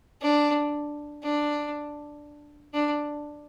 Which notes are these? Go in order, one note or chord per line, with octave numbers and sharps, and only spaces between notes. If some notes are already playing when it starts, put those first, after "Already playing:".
D4
D4
D4